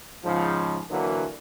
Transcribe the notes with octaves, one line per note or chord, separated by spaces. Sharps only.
G#2 C#3 F3
D3 E3 F#3 A#3